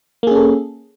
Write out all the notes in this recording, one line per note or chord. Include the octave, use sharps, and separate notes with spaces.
A#3 C#4 G#4 A4